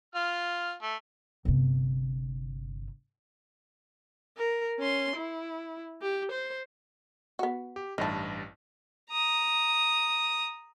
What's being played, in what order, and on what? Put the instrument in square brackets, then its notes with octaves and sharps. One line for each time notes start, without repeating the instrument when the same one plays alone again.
[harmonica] F4 F6
A3
[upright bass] G1 C3
[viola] A#4
C#4 C6
E4
G4
C5
[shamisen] B3 F#4
[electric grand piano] G4
[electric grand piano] A1 G2 A5 [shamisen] D#4 E4
[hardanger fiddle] A#5 D#6